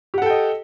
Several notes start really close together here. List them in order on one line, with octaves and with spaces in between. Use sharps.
G4 F#5 A4 G5 D#5